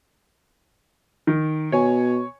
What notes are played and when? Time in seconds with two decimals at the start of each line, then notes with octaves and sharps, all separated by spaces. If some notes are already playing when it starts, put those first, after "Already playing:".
1.27 D#3
1.72 B2 C#5 G#5